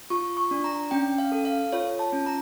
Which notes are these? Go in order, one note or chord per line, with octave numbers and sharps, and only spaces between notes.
F4 C#6
C#6
D4
A#5
C#4 G5
F5
A4
F5
F4 C#5
A5
C#4
A#5